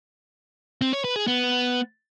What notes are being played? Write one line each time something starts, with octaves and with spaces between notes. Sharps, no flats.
C4
C#5
B4
G#4
B3